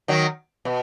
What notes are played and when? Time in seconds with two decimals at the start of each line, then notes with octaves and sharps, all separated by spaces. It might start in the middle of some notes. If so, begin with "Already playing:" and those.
0.08 D#3 F#3
0.65 B2